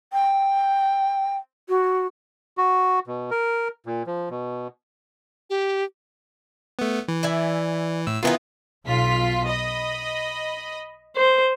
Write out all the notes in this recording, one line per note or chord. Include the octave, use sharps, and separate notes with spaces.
G5
F#4
F#4
B2
A#4
A#2
F3
B2
G4
A3 B3
E3
D5 E5 G#5
A2 E6
D#3 E3 B3 D#4 F4
B1 F4 B6
D#5 B5
C5